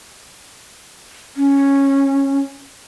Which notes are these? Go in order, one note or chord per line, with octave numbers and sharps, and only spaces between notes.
C#4